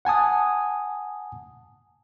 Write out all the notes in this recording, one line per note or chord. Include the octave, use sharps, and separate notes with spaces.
F#5 G#5 A5 D#6